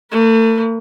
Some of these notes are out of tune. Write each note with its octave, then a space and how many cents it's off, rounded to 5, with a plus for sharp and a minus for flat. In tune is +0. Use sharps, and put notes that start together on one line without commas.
A3 +40 B4 -25